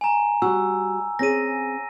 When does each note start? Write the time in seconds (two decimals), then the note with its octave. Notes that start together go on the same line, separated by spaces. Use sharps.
0.01 G#5 A#5
0.42 G3 F#4 E6
1.19 C4 C#4 G#4 A#6 D#7